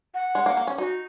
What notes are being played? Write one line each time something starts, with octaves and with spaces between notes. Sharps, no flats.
F#5
G#3
A#3
A#3
C#4
D#4 F#4